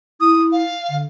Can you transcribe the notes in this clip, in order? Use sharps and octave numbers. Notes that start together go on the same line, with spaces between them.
E4 D#6
F5
D3